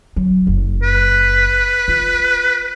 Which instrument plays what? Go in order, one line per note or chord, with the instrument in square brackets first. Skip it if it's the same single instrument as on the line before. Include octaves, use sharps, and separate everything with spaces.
[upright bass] F#3
F#1
[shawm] B4
[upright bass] F4